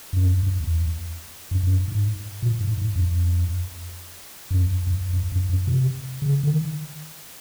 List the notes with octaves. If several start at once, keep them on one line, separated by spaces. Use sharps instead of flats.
F#2
F2
F#2
E2
F#2
F#2
G2
G#2
A#2
G#2
G#2
F2
F#2
F2
F2
F2
F#2
F#2
C3
C#3
D3
D#3